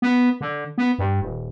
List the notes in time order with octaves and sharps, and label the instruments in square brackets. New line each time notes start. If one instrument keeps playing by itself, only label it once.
[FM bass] B3
D3
B3
G2
D#1